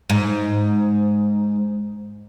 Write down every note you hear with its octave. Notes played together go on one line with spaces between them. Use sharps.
G#2